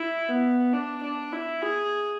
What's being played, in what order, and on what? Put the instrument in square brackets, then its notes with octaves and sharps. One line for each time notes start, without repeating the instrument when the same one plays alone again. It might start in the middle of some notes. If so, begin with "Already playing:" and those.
Already playing: [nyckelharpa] E4
B3
D4
D4
E4
G#4